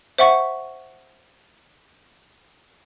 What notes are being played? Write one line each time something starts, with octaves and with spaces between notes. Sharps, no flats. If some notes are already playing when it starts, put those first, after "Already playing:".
C5 E5 F#5 C#6